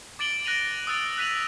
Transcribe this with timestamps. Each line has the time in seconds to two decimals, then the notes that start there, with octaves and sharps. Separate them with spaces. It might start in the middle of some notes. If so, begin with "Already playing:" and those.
0.19 D6 A6 D7 F#7 G7
0.45 F#6 A#6 D7 D#7 F7
0.87 D#6 E6 F#6 A6 D7
1.18 F#6 B6 D#7 F7 F#7